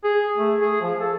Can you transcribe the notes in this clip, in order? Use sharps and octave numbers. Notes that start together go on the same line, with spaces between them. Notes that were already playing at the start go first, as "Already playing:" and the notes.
G#4
A3
G#4
F3
A4